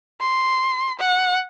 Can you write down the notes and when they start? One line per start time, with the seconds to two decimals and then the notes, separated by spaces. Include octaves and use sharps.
0.21 C6
0.99 F#5